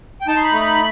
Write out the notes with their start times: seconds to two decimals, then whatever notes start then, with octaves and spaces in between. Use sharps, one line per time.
0.21 G5
0.28 D#4 A5
0.36 C6
0.44 B5
0.52 A3
0.61 B5